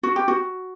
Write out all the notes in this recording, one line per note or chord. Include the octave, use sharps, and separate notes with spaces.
F#4
G4
F#4